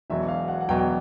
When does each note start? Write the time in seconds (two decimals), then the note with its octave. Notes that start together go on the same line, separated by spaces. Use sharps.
0.10 E1 E2 B2 F#3 E5
0.28 F5
0.48 F#5
0.61 F#5
0.68 E1 E2 B2 F#3 G5
0.79 G5